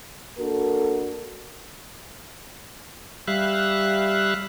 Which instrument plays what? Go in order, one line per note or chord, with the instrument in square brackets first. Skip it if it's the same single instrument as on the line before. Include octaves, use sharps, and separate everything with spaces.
[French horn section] A#3 D4 F#4 A4 A#4
[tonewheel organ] G3 E5 F5 F#6